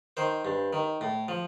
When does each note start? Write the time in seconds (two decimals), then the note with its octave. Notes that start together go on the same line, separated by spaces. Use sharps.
0.17 D#3 C5
0.45 G2
0.73 D#3
1.01 A2
1.28 F3